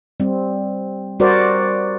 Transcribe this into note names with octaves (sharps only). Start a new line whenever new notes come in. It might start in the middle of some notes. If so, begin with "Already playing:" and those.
G3 C4
G3 F#4 A#4 C5 D5